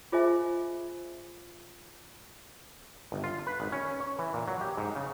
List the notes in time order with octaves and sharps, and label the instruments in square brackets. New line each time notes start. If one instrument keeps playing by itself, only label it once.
[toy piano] F4 G#4 C5 D#5 E5 G#5
[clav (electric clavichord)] G1
F4
B4
G#1
C#4
C#5
E3
A#2
F#3
G4
G#2
C#3